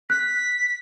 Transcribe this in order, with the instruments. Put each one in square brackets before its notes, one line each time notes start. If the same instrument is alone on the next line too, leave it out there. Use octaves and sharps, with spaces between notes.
[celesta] F#6 [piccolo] B6